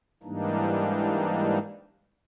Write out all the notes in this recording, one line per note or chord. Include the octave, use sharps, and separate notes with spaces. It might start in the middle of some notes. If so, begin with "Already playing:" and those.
G#2 E3 G3 A#3 D4 D#4